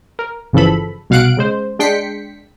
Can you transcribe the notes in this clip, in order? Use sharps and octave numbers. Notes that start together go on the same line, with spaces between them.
A#4
G1 C#3 E3 F3 A4 B5
C2 B2 F5 F#5 F#6 D7
C#3 G#3 C5
G#3 D4 G5 C6 B6 C#7